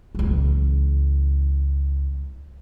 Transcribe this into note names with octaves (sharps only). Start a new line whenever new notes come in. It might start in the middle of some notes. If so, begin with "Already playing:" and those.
C#2 E3